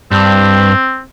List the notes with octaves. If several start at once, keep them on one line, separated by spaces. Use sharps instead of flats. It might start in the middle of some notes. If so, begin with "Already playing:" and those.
G2 C4